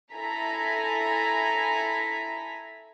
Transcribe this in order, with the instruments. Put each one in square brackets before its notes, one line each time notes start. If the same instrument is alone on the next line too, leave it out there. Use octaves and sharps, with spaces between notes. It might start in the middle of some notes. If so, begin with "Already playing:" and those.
[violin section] E4 A4 G#5 A#5 B6